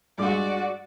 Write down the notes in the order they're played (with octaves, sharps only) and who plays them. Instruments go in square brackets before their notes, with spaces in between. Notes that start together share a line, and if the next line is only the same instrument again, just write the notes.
[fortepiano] G2 G#3 D6 [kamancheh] F#4 D5